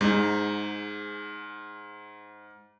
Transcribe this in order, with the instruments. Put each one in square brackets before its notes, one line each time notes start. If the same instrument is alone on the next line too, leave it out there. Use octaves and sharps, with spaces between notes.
[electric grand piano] G#2 [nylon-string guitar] G#3 D#4